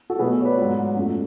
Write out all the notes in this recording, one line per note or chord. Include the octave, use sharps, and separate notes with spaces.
F#4 A4
B2 F#3 A3 G#4 B4
C#5
B4 D5
G#2 F#3 B3
F#2 F3 A3